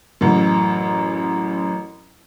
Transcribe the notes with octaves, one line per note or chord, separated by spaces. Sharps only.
A1 F#2